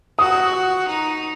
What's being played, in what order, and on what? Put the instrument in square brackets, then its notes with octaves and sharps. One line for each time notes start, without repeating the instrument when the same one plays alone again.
[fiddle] F#4 [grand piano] D#6
[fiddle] D#4